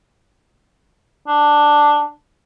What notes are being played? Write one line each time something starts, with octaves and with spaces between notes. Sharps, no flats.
D4